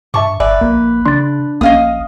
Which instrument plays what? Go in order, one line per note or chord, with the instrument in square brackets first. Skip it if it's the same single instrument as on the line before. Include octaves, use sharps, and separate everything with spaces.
[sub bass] G2 [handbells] E5 A5 D6 [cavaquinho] C#6
[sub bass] G1 [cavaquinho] B4 [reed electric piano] D5 E5 [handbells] G#5
[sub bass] A#1 [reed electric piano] A#3
[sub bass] C#3 [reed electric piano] D4 [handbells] C6 A6
[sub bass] A#1 [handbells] A#3 C#4 [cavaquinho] D#5 F5 D#6